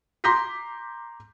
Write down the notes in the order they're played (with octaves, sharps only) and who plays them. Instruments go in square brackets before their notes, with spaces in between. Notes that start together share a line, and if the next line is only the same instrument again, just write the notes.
[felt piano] A#5 C6 D6 G6 A#6 B6